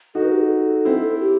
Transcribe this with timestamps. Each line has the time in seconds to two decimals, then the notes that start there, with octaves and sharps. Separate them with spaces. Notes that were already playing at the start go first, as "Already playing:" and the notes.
0.15 D#4 F#4 A4
0.23 B4
0.33 G4
0.41 A4
0.85 C4 E4
1.14 A4
1.20 G4